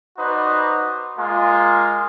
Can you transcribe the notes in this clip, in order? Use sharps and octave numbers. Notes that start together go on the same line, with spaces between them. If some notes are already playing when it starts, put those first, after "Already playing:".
D#4 F#4 B4 C5 D5
G#3 A#3 F4